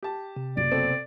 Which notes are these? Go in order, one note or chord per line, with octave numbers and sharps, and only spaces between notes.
G4 A5
C3
F#1 D5
B2 C4 A4